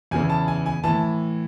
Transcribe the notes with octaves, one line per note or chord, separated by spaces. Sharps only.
E2 C#3 E3 G#5
A5
G#5
G#5
A2 E3 A5